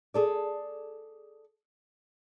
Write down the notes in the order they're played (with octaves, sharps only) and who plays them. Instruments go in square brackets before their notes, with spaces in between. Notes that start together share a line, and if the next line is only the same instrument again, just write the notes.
[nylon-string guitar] G#4 A4 D5